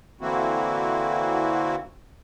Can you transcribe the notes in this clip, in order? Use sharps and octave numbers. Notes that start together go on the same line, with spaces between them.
D3 E3 A#3 C4 E4 F#4